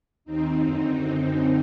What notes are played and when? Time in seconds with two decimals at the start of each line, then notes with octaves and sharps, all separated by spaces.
0.25 D#2 D#3 C4 D#4
0.62 F#2 D3
1.00 F#2 D3 C4 D#4